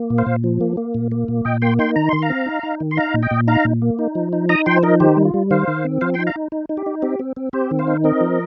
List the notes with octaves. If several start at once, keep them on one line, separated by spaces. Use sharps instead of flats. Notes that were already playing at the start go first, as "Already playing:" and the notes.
Already playing: A#3
A#2
C5 F5
A#2
F3
A#3
A#3
A#2
A#3
A#2
A#2 D#5 G5
A#3 G5 C6
D#4 G5 C6
D#3 A#5
D#3 C6
F5 A#5
C4
D#4
D#4
D#3
C6
D#4 F5 A#5
A#2
D#5 G5
A#2
D#4 F5 A#5
A#2
A#3
D#4
F3
D#4
D#4 A#5 D#6
F3 G5 C6
C5
D#4 A#4 D#5
D#3 G4 C5
G3
F4
G3
D#3 C5 F5
D#3
C4
F3 C5 F5
D#4 G5 C6
F5 A#5
D#4
D#4
D#4
G4
D#4
C4 G4
C4
C4
C4 G4 C5
D#3
C5 F5
D#4
C4 A#4 D#5
F3